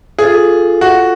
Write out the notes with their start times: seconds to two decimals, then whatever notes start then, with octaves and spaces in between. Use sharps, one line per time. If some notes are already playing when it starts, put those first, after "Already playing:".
0.19 F4 G#4 A4 F5
0.81 F#4